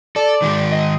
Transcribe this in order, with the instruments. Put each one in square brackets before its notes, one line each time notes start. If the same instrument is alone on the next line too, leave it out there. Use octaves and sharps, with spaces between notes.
[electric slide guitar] A4 [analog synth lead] D5
[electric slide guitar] D#3 G#3 G#4
[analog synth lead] D#5